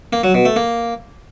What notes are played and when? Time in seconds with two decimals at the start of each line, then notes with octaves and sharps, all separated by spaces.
0.13 A#3
0.24 F#3
0.34 B2
0.45 A3
0.56 A#3